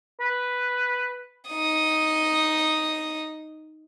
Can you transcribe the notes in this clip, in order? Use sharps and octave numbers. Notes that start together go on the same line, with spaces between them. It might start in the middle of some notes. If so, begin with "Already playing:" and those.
B4
D#4 D#6